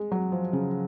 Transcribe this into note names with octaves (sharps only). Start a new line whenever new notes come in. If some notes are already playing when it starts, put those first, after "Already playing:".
Already playing: G#3
F#3
F3
C#3